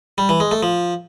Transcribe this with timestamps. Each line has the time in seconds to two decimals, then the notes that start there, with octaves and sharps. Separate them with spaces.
0.18 G3
0.29 E3
0.40 G#3
0.51 A3
0.63 F3